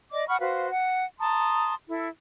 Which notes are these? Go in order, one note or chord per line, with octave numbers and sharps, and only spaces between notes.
D5 D#5 D6
F#5 B5 C#6 F6
F#4 B4 C5 F5
F#5
A5 A#5 C6 D#6
E4 A4